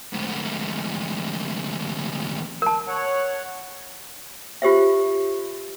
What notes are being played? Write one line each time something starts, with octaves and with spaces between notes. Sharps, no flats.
D2 G#2
A#4 A5
C#5 F#5
F4 G4 C5 E5